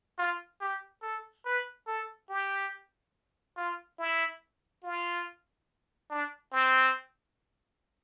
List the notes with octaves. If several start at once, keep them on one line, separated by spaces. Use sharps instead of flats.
F4
G4
A4
B4
A4
G4
F4
E4
F4
D4
C4